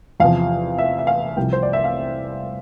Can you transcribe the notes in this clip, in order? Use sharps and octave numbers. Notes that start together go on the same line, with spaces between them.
E2 C3 F3 F5
E5
E5
F5
C2 C3 F3 G5
C5
D5
E5
F5